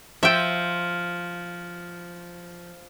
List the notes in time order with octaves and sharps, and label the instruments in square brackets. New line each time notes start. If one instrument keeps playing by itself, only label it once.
[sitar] F3 [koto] E5 G5